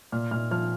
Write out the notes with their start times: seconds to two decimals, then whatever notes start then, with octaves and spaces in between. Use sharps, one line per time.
0.12 A#2 F6
0.31 A#2 F6
0.51 F3 F6